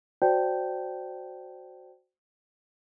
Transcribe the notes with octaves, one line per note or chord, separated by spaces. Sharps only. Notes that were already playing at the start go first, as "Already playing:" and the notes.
F#4 C5 D5 G5 A5 G6